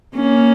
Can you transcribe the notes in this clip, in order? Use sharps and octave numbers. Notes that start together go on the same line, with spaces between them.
A#3 C#4